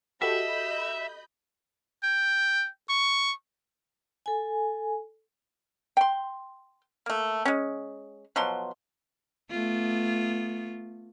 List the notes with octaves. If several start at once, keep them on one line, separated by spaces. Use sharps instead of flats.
F#4 G4 A4 D#5 E5 B5 G6
G5
C#6
A4 G#5
G5 C6
A3 A#3
G#3 C#4
B2 F3 F#3 C6
A3 B3 F4